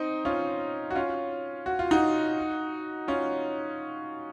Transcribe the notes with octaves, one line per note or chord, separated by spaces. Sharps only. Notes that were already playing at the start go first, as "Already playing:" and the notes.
Already playing: C4 D#4
C#4 F4
F#4
C#4 F4
F#4
F4
D#4 F#4
C#4 F4